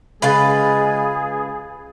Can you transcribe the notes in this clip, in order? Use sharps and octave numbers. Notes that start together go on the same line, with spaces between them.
C#3 G#3 F4 G#4 B4 B5 A6